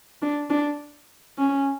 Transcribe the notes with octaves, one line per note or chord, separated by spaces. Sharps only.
D4
D4
C#4